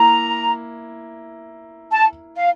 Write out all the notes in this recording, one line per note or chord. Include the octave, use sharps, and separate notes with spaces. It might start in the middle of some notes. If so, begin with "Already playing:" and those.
Already playing: A#3 E4 A#5
A5
F5